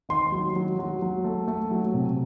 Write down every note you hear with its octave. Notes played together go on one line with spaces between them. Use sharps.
D#3 C6
F#3
F#3
F#3
F#3
A3
A3
F#3
C3